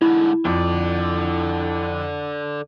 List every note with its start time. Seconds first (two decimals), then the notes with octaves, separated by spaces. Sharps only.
0.02 G#2 D3 E4
0.45 F2 D3 D5